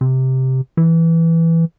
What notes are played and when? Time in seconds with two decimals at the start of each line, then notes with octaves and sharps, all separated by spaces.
0.01 C3
0.77 E3